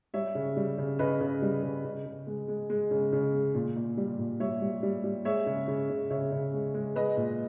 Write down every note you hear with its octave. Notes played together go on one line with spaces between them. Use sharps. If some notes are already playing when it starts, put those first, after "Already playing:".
G3 C#5 E5
C#3
G3
C#3
C#3 B4 D#5
C#3
G3
C#3
C#3
C#3
G#3
G#3
G#3
C#3
C#3
G#3
A#2
A#2
G3
A#2
G3 C#5 E5
G3
G3
G3
G#3 C#5 E5
C#3
C#3
C#3
C#3 C#5 E5
C#3
G#3
G#3
G#3 B4 D#5
A#2